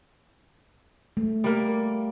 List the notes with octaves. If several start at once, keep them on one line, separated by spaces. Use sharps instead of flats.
A3
G3 A#3